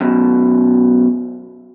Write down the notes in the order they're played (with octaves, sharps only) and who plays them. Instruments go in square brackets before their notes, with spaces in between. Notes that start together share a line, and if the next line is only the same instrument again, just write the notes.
[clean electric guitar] F#2 B2